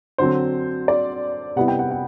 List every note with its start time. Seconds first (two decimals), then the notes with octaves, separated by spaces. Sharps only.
0.18 D3 F#3 C4 C5
0.88 D5
1.56 C3 G3 B3 E4 F#5
1.68 G5
1.79 F#5
1.91 F#5